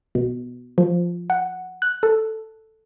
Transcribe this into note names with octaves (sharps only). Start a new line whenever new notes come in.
B2
F3
F#5
F#6
A4